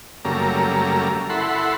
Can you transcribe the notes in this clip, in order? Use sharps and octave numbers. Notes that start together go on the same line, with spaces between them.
F#2 C#3 G3 A3 A#3 A#5
E4 A4 F#5 B5 C6